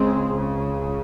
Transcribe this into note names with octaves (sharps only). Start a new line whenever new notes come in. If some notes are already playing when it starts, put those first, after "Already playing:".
Already playing: C#2 C#3 G#3 C4
C#3